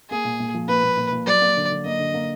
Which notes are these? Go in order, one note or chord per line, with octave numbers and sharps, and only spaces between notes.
A#3 G#4
A#2
A#2
F3
A#3 B4
A#2
A#2
A#2
F#3 D5
A#3
D3
D3
A#3 D#5
D3
A#3